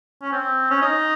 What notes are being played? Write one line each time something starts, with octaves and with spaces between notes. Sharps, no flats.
C#4
C4
C#4
D#4